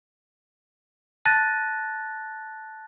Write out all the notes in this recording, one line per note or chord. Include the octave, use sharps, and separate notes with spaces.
A5 F#6 A6 A#6